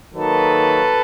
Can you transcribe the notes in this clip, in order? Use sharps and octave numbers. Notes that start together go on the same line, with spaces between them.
D#3 F#3 A#3 D#4 A4 B4